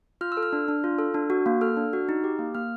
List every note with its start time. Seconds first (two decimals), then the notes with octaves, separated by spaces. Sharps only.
0.21 F4 F6
0.32 E6
0.37 A4
0.43 F6
0.53 D4
0.68 D4
0.84 F4
0.99 A4
1.14 D4
1.30 F#4
1.46 A#3
1.61 A4 F6
1.77 D4
1.93 F#4
2.09 D#4
2.24 G4
2.39 A#3
2.55 A#3 F6